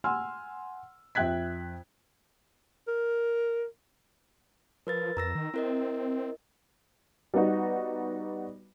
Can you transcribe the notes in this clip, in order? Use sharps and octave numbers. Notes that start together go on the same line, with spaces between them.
F#5 G#5 C6 E6 F6
F2 E5 G5 F#6 G#6 B6
A#4
F3 A#4 B4 A6
F2 A#5 E6 A#6
D#3
C4 E4 A#4 D#5
G3 B3 D#4 F#4